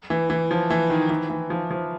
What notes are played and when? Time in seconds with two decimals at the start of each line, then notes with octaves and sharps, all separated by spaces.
0.10 E3
0.30 E3
0.51 F3
0.70 E3
0.90 D#3
1.10 E3
1.30 E3
1.50 F3
1.70 F3